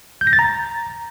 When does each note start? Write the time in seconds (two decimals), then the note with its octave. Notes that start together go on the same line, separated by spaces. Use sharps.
0.21 G6
0.27 A#6
0.33 A6
0.39 A#5